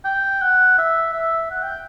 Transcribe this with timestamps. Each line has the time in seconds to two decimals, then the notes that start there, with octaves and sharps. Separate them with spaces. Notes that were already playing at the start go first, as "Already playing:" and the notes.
0.05 G5
0.42 F#5
0.78 E5
1.13 E5
1.51 F#5
1.63 G5